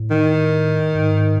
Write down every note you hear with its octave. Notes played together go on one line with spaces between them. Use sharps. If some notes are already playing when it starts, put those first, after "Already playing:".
Already playing: A2
D#3
G#2